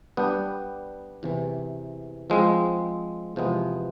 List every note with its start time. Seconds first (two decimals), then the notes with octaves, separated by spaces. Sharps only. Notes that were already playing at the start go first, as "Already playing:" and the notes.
0.17 G3 B3 D4 G4
1.23 E2 C3 E3
2.30 F3 G#3 C4
3.36 E2 C3 F3 G#3 B3